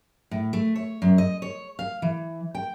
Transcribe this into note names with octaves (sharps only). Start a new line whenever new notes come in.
A2
A3
C#5
F#2
D#5
C#5
F5
E3
G5